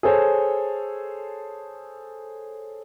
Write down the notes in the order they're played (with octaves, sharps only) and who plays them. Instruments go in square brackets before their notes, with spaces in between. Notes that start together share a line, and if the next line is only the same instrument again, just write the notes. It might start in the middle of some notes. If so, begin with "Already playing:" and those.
[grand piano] G#4 A4 C5 C#5 G#5